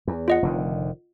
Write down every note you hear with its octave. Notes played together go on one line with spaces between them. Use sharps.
E2
F4 D#5 F#5
F1 D3 D#3